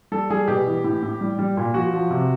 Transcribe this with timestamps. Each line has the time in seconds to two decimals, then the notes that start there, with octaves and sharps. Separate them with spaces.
0.12 G3 A4
0.30 G3 G#4
0.48 B2 G4
0.66 E3
0.84 A2
1.02 A2
1.21 G3
1.39 G3
1.57 A#2
1.74 F3 F#4
1.93 F3
2.10 C3